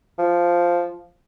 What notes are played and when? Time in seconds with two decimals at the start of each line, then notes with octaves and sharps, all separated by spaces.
0.19 F3